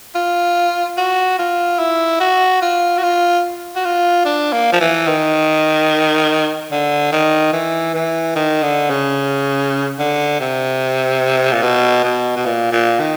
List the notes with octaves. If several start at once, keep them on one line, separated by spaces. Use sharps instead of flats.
F4
F#4
F4
E4
F#4
F4
F#4
F4
F#4
F4
D4
A#3
F3
E3
D#3
D3
D#3
E3
E3
D#3
D3
C#3
D3
C3
A#2
B2
B2
B2
A#2
A#2
D#3